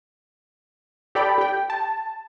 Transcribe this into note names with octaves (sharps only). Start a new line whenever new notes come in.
G4 A4 D5 G5 B5
G4 G5
A5